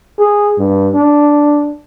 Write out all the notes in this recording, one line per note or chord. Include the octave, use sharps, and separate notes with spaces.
G#4
G2
D4